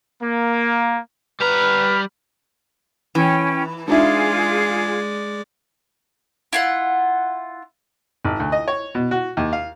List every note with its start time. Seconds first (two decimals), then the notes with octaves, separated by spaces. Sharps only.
0.22 A#3
1.40 G3 B4 A#5 B5 F6
3.15 E3 C#4 G5
3.88 G#3 D4 D#4 F4 G#4 D5 E5
6.53 E4 F4 F#5
8.25 G#1
8.40 D2
8.52 D#5
8.68 C#5
8.95 B2
9.11 F#4
9.37 D#2
9.53 F5